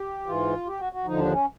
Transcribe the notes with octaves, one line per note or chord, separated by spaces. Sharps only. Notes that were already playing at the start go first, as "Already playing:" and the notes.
Already playing: G4
G#2 E3 F4
G4
F#4
F#4
D#2 D3 F3 D#4
D4
C#4